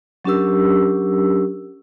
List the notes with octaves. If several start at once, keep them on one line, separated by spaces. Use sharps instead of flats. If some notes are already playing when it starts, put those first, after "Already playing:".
F#3 C#4 D4 G4 A#4 E6